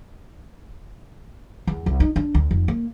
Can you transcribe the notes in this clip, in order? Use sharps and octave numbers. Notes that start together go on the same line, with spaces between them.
E2
C2
D#4
D4
D2
F1
A#3